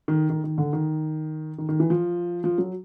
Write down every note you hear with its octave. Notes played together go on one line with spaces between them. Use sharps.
D#3
D#3
D#3
D3
D#3
D#3
D#3
E3
F3
F3
F#3